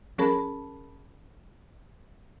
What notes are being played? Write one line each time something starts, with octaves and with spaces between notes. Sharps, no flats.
F3 C#4 G#4 A#4 A5 B5